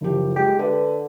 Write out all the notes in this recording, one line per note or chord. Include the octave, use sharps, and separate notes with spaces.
F#1 F3 G4
G#3 G4
D3 B4